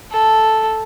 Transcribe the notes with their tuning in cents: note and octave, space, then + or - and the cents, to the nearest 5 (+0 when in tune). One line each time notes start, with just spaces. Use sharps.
A4 -5